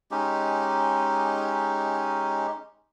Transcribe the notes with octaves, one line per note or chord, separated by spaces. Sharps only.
G#3 C#4 D#4 G4